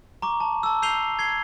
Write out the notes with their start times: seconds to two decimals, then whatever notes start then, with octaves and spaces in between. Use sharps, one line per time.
0.22 A#5 C#6 D6
0.40 A5
0.63 A5 E6
0.82 E6 G6 C7 D#7 F7 G7
1.19 G#6 C7 G7